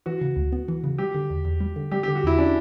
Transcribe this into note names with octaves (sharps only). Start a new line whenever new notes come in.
E3 F#4
C#3
D2
B3
E3
C#3
G3 G4
D3
E2
E2
G3
D3
G3 G4
G4
D3
F#4
E2 E4
C#4 D4